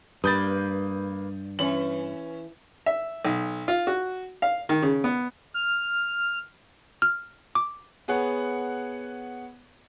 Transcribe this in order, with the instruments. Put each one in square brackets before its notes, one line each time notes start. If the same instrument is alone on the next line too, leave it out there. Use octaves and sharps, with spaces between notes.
[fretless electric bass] G2 [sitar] A#3 B4 [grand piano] D#6 G6 A6
[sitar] E3 [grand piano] C#4 F#7
[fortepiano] E5
B1
F4
F#4
F5
D#3
C#3
B3
[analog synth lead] F6
[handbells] F6
D6
[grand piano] B3 G#4 C#5 F#5